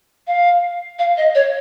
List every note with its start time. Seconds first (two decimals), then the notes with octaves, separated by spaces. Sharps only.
0.27 F5
0.99 F5
1.17 D#5
1.35 C#5